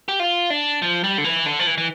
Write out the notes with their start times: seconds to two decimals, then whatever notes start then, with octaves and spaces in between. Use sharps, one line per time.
0.08 G4
0.20 F4
0.50 D4
0.82 F3
1.04 G3
1.18 D3
1.24 E3
1.46 D3
1.59 F3
1.67 E3
1.78 E3